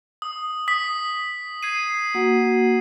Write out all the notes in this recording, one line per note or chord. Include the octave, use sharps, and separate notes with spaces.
D#6
D#6 B6
G#6 C7 D#7
A#3 F#4 F#5